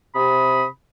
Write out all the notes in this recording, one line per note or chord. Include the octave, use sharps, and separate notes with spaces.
C3 B5 D#6